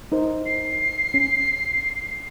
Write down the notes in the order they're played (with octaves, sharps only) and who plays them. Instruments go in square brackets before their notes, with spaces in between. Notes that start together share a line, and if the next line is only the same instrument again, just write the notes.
[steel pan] D#4 A#4 C5
[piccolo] C7
[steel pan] C#4